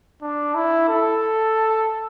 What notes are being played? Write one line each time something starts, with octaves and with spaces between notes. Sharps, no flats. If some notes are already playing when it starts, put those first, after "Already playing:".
D4
E4
A4